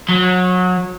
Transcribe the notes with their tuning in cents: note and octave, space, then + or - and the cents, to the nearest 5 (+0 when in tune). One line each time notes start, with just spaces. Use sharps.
F#3 -25